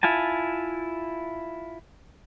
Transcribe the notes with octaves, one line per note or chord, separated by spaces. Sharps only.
E4 F4 G#5 A5